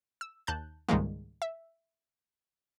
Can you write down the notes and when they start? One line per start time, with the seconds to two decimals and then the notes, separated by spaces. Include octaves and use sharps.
0.21 E6
0.47 D#2 A5 F#6 G6
0.89 C#2 G#2 D#3 G3 G#3 A#3
1.42 E5